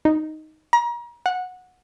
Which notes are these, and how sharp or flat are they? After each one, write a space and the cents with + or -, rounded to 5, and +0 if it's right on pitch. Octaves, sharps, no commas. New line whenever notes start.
D#4 +0
A#5 +35
F#5 -15